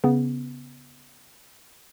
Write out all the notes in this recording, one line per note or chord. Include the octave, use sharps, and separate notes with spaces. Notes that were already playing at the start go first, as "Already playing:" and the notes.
C#3 B3